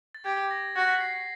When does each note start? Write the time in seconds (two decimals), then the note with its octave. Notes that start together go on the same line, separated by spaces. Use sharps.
0.15 A6
0.25 G4 G#6
0.51 A#6
0.76 F#4 A6
0.88 B6
1.01 C7
1.13 C7